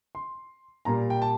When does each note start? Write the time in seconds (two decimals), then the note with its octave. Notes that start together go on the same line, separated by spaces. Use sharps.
0.15 C6
0.85 A#2 G3 A#3 A#5
1.10 G5
1.22 A5